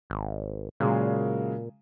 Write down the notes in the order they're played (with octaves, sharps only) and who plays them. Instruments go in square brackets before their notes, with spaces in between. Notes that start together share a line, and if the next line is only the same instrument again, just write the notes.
[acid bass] G#1
[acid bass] A#2 [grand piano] C#3 F#3 G#3